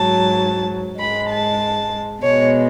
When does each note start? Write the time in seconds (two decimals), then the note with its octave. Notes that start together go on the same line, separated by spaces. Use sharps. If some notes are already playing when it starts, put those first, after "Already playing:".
Already playing: G#2 F#3 A5
0.99 G#2 G#3 B5
1.30 A5
2.22 B2 G#3 C#5